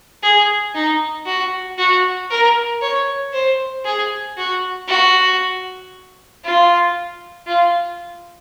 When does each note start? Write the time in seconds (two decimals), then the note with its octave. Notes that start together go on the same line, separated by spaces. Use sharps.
0.23 G#4
0.75 D#4
1.26 F#4
1.78 F#4
2.30 A#4
2.82 C#5
3.33 C5
3.84 G#4
4.37 F#4
4.88 F#4
6.44 F4
7.47 F4